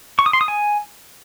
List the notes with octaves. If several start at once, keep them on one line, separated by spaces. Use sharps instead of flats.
C#6
D#6
C6
D#6
G#5